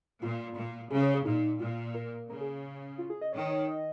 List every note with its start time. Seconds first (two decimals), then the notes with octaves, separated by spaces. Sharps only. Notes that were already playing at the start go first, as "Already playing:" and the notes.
0.21 A#2 F4
0.56 A#2
0.90 C#3 G#4
1.03 C#5
1.14 G#4
1.25 A#2 D#4
1.60 A#2 F4
1.94 A#4
2.29 C#3 A#4
2.41 G#4
2.98 F4
3.10 G#4
3.22 D#5
3.32 D#3 C#5
3.50 C#5
3.68 D#5